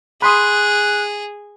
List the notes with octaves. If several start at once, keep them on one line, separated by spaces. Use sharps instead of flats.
G#4 B5 C6 D#6 F#6